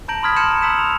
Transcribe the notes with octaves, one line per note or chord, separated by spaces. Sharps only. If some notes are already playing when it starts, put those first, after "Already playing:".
A5 A#5 G6 A#6 D7 F#7
B5 C6 D#6 F6 G#6 B6
A5 C6 G6 C#7 E7 F#7
A#5
A#5 C6 D#6 E6 B6 E7
F7